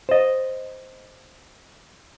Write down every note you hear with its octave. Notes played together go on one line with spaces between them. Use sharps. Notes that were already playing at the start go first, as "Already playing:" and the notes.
C5 D#5